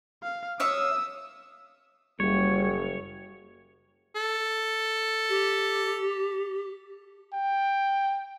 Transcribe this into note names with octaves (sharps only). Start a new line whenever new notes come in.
F5
C#5 E5 F5 D#6 E6
F#1 G3 C#5
A4
G4
G5